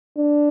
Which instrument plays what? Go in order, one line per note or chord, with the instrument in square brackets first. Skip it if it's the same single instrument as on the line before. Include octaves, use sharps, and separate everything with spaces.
[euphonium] D4